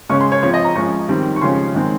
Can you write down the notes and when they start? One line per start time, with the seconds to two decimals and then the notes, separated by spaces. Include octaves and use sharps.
0.09 C#3 G#3 C#4 C#6
0.21 C6
0.32 C#5
0.43 F3 C4 C#5
0.54 D#5
0.65 A#5
0.75 F3 G#3 C#4 C#6
1.08 D#3 G3 C4
1.36 C#6
1.41 C#3 F3 G#3 C#4 C6
1.74 D#3 G#3 C4